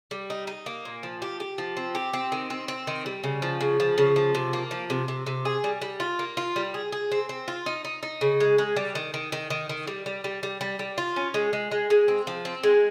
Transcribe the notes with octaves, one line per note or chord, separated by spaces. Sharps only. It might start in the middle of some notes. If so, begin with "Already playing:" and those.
G3
D#4
D#4
A#3
A#2
F3
G4
G4
F3
C4
G4
C4
D#3
C4
C4
D#3
G3
C#3
F3
C#3
F3
C#3
F3
C3
A#3
F3
C3
C3
C3
G#4
G3
G3
F4
A#3
F4
G3
G#4
G#4
C4
C4
F4
D#4
D#4
D#4
C#3
G#3
G#3
G3
D#3
D#3
D#3
D#3
D#3
G3
G3
G3
G3
G3
G3
F4
C#4
G#3
G#3
G#3
G#3
C4
F3
C4
G#3